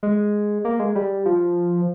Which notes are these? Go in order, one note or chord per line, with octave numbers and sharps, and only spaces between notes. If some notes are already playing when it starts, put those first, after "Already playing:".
G#3
A#3
G#3
G3
F3